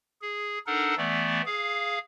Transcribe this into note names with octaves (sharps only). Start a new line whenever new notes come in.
G#4
D4 D#4 A4 A#4 F#5
E3 A3 B3 D5
G#4 F5